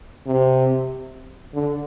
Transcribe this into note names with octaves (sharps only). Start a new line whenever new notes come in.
C3
D3